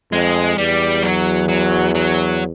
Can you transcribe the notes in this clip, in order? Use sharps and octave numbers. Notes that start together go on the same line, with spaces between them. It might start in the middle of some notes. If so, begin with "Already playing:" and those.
F2 G#3
E2 G3
F#3
F#3
F#3